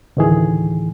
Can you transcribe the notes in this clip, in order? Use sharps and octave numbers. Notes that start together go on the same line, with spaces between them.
D2 A2 D#3 E3 G#4